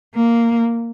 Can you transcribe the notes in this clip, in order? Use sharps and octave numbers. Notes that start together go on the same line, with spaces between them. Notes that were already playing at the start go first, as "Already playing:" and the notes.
A#3